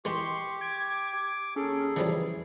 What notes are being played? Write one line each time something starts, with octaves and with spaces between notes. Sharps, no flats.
E3 G#3 G4 C6 C#6
D6 G#6
D#2 C#4 G#4 A4
C#3 E3 F3 G3